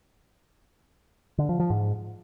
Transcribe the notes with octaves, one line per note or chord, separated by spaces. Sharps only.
D3
F3
F3
G#2